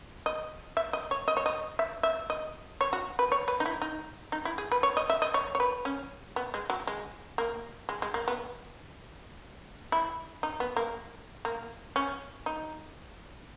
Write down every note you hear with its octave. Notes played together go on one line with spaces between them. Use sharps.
D#5
E5
D#5
C#5
D#5
C#5
D#5
E5
E5
D#5
C#5
F#4
B4
C#5
B4
D#4
E4
D#4
D#4
E4
G#4
B4
C#5
D#5
E5
D#5
C#5
C#5
B4
C#4
B3
G#3
F#3
G#3
A#3
G#3
G#3
A#3
B3
E4
D#4
B3
A#3
A#3
C#4
D#4